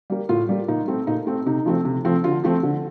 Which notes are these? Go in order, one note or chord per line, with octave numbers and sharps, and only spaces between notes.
G3 A#3
A2 F4
G3 A#3
A#2 D#4
A3 C4
A#2 D#4
A3 C4
C3 D#4
F3 A3 C4
C3
F3 A3 C4
D3 F4
F3 A3 C4
D3